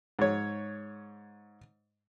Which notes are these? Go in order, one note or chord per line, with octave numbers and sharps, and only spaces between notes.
G#2 C#5